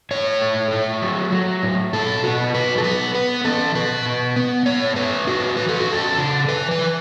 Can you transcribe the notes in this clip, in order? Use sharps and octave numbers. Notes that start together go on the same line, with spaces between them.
A2 C#5
A3
A3
F#3
F#3
A2
B2 A4
B2 F#4
F#3 B4
A4
B3 B4
B3 B4
E3 A4
B2 B4
B2
B3
A2 C#5
A3 B4
A2 F#4
E3 B4
A4
F#4
E2
A4
C#3
E3 B4
B4
E3